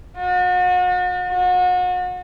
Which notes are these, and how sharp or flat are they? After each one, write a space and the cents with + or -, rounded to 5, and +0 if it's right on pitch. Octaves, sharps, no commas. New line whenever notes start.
F#4 -40
F#4 -35